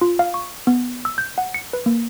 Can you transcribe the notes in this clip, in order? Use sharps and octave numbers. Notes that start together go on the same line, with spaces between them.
F4
F5
C#6
B3
E6
G6
F#5
C#7
B4
A#3